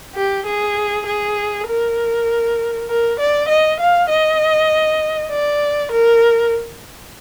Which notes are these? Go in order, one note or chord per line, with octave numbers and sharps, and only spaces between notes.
G4
G#4
G#4
A#4
A#4
D5
D#5
F5
D#5
D5
A#4